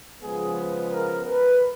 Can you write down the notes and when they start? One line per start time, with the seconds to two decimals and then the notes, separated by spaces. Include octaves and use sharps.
0.21 C#3 F3 G#3 B3 G#4
0.90 A#4
1.25 B4